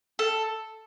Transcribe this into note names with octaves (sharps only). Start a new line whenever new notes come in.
A4